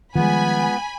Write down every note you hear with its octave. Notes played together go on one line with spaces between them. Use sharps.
D#3 F3 G3 G#3 B3 F4 G#5 B5